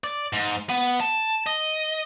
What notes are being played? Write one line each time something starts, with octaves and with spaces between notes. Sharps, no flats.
D5
G#2
B3
A5
D#5